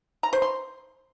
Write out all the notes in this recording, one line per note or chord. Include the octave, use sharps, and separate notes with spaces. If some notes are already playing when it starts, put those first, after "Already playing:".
A#5
C5
C6